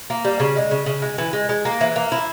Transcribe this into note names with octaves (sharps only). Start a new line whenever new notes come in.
A#3
G3
C#3
G#3
C#3
C#3
G#3
E3
G#3
G#3
A#3
E3
A#3
E4